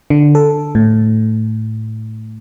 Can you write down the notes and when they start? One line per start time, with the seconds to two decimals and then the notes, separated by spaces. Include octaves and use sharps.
0.10 D3
0.35 A4
0.75 A2